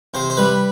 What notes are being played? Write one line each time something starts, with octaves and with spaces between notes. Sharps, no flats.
C3 C5
C5
G3 B4